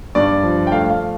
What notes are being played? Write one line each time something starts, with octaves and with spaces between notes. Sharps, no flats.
G2 D5
F3
G5
A3 F5
F5